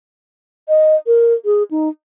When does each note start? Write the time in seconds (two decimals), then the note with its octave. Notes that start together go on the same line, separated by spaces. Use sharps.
0.69 D#5
1.07 A#4
1.45 G#4
1.71 D#4